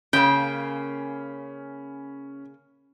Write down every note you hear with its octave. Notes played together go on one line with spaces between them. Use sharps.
C#3 A#3 C#4 G5 B5